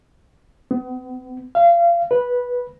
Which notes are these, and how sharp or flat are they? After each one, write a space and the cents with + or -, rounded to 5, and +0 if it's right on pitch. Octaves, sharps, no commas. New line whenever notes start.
B3 +40
F5 -30
B4 -10